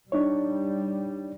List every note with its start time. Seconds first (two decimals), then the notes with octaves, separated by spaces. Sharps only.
0.12 G3 D4 D#4 C#5